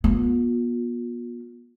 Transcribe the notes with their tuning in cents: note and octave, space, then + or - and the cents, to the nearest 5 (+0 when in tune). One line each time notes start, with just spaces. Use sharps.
B3 -40 F4 +40